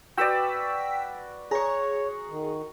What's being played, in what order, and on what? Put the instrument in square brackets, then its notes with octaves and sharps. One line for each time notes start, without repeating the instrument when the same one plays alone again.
[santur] F#4 B4 D5 [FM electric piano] G5 E6 B6
[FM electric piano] G#4 [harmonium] C#5 [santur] A#5 C#6
[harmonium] D#3